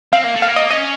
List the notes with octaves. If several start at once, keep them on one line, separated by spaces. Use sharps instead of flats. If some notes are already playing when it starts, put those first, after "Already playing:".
C4 F5
A#3
A3
F5
A#3
D#5
C#4 D#5